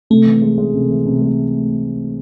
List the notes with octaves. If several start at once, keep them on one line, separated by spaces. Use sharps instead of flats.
C3 A3
E3
G#3
G#3
C3
E3
C3
G#3